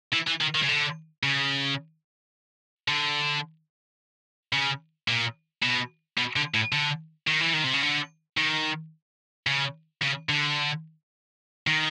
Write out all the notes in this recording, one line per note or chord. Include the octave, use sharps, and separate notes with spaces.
E3
E3
D#3
D#3
C#3
D3
C#3
D3
C#3
A#2
B2
B2
D3
A2
D3
D#3
E3
D#3
C3
C#3
D3
D#3
C#3
C#3
D3
D#3